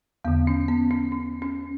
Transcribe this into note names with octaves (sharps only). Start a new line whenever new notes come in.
E2 D3 B3
C#4
B3
C#4
C#4
C#4